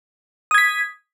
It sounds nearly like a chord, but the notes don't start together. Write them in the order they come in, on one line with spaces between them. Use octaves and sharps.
D#6 G#6 B6